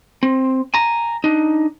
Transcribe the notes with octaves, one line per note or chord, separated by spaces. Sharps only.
C4
G#5 A#5
D4 D#4